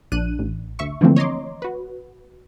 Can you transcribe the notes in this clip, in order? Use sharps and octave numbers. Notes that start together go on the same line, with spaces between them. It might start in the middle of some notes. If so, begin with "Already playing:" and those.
A#1 D4 F#6 D#7
A1
D2 E5 C#6
D3 E3 F3 A3 A#3 C4
C#5 D#5 A#5 C6 D6
F#4 B4